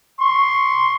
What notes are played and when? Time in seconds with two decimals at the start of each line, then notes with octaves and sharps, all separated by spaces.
0.20 C6 C#6